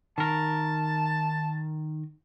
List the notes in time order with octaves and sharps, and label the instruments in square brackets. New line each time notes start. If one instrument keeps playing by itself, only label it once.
[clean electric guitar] D#3 A#4 [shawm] A5